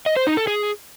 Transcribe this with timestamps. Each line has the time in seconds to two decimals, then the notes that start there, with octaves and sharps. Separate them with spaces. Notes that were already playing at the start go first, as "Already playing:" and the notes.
0.06 D#5
0.17 C5
0.27 D#4
0.37 A4
0.47 G#4